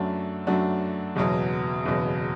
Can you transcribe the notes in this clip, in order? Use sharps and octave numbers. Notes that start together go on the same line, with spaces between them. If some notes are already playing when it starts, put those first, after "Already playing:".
Already playing: F#2 F#3 A3 D4 F#4
F#2 F#3 A3 D4 F#4
F#1 E2 B2 F#3
F#1 E2 B2 F#3